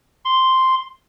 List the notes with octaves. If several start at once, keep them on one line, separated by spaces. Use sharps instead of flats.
C6